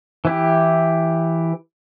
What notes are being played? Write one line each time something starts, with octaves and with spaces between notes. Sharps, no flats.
E3 E4 G4